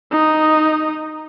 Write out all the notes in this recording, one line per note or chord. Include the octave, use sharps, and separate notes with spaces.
D#4 D#6